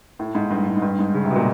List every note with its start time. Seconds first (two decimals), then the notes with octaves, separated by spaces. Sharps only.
0.19 A2
0.35 G#2
0.51 G2
0.66 G#2
0.77 G#2
0.82 G2
0.99 G#2
1.14 C#3
1.25 C3
1.31 B2
1.36 A#2